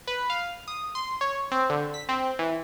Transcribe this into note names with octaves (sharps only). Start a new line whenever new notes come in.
B4
F5
D#6
C6
C#5
C4
D3
B6
C4
E3